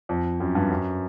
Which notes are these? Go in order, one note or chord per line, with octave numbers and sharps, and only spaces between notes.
F2
F#2
G2
F#2